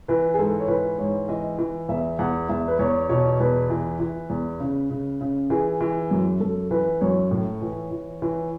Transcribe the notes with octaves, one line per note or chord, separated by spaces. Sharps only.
E3 B4
G#4
G#2 A4
C#5
E3 B4
G#2 C#5
E3 D#5
E3
E2 E5
E2 F#5
E2 E5
B4
E2 C#5
B2 C#5
E2 B4
E3
E3
E2
C#3
C#3
C#3
E3 G#4
E3
F#2
F#2 A4
E3 B4
F#2 C#5
A2
E3
E3
E3